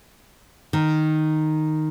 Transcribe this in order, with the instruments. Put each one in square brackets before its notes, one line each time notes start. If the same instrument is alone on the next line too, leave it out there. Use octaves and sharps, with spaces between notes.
[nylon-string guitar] D#3